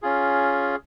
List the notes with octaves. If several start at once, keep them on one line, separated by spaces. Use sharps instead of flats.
C#4 F4 G#4